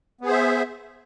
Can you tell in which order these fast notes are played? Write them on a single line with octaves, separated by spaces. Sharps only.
B3 G#4 C5 E5